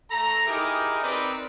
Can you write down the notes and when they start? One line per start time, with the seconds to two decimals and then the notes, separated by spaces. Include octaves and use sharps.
0.11 A3 A4 A#5
0.47 D#4 E4 G4 G#4 A#4
1.02 C4 D#4 A#4 B4 D5